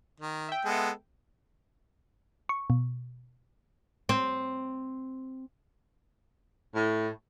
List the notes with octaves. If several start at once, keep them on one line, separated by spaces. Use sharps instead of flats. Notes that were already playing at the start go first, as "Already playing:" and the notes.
D#3
E5 G5
G#3 B3 A4
C#6
B2
C4
A2